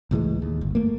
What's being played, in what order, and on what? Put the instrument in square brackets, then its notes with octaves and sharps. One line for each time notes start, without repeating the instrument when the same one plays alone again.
[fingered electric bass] C#2 A2 E3 G#3
D#2
G1
A3 A#3